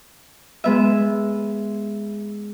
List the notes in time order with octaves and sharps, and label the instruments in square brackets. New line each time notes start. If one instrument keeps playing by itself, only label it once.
[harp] G#3 B3 E5